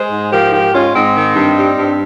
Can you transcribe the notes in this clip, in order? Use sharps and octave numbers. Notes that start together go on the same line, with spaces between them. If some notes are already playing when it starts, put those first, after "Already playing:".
Already playing: G#3 G#4 C5
G#2
F3 G4 A#4
G#2 G4 A#4
G#3 C#4 F4
G#2 C4 D#4
D#3
G2
G3
G2